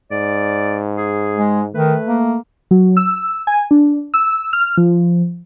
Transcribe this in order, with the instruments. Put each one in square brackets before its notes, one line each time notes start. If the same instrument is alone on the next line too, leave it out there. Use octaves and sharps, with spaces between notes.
[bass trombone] G#2 [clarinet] D5
[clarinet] G#4
[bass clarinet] G#3
[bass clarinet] D#3 [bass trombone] A3 [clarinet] B4
[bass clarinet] A#3
[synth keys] F#3
E6
G#5
D4
E6
F6
F3